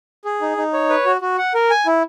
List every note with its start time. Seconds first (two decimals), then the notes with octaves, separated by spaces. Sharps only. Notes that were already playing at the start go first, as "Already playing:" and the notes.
0.25 G#4
0.41 D#4
0.57 D#4
0.73 C#5
0.89 B4
1.05 F#4
1.21 F#4
1.38 F#5
1.54 A#4
1.70 G#5
1.86 E4